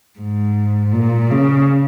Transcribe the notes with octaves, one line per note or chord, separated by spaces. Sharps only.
G#2
A#2
C#3